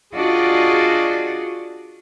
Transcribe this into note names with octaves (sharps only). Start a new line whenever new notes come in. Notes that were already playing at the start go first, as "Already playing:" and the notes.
D4 F4 F#4 G#4 D5 D#5